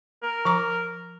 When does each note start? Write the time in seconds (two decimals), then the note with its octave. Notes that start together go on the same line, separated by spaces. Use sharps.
0.23 A#4
0.45 F3 A#5 D6